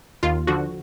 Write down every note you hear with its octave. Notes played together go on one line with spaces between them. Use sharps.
D#2 F4
D3 F3 F#4